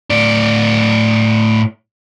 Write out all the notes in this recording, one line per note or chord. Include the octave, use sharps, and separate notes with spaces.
A2 D5